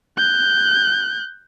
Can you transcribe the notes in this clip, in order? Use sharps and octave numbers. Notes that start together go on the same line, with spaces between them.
F#6 G6